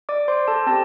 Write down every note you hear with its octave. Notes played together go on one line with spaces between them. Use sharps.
D5 D6
C5 C6
A4 A5
C4 G4 A4 A5